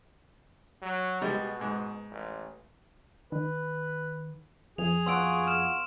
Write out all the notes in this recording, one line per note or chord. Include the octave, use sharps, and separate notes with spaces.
F#3
B2 G3 G#3
G#2
A1
D#3 B4
F2 G#4 F7
B3 F4 F#4 C6 E6 D7
F6 E7